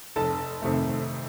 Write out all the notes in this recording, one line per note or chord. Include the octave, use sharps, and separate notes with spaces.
F1 A4 A5
F2 C3 D#3 A3